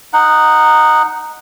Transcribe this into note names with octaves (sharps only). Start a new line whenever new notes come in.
D#4 F#5